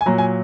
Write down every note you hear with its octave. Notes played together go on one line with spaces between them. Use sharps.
G#5
A#2 F#3 A#5
G#5